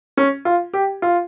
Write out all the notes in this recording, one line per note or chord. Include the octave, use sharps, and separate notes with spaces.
C#4
F4
G4
F4